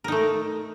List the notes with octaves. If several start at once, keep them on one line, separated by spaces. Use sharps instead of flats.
A3 D#4 A#4